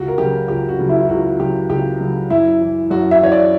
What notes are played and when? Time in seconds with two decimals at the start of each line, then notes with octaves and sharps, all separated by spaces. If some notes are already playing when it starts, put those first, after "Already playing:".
Already playing: C#2 F#4
0.08 A#4
0.18 C#3 F#3 G4
0.48 C#2 G4
0.69 F#4
0.79 C#3 F#3
0.89 E4
1.01 E4
1.09 C#2 F#4
1.39 C#3 F#3 G4
1.69 C#2 G4
2.00 C#3 F#3
2.30 F#2 E4
2.61 E3
2.91 F#2 F#4
3.11 E5
3.21 E3 C#5
3.32 D5